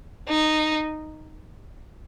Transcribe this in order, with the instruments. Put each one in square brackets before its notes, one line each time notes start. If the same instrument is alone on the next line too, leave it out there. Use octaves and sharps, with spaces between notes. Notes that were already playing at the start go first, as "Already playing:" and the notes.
[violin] D#4